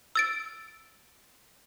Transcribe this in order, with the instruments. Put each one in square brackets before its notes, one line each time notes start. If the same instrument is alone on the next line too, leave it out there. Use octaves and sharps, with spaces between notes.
[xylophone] E6 A6 D7